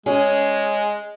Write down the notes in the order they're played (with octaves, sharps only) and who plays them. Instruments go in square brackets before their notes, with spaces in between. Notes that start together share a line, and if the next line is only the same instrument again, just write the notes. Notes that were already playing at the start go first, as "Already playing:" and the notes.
[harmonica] G#3 [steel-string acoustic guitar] C#4 G#4